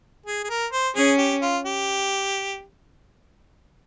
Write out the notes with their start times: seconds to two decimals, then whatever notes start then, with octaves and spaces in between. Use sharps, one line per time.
0.26 G#4
0.44 G#4
0.50 A#4
0.73 C5
0.95 C#4 G#4
1.18 G4
1.42 F4
1.65 G4